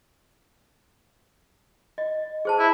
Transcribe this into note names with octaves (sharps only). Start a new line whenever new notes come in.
D#5
G#4 C5 A5
E4